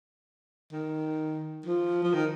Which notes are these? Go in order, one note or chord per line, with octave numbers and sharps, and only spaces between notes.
D#3
F3
F3
D#3